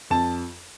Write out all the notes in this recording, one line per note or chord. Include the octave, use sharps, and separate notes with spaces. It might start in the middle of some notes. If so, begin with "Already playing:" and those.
F2 A5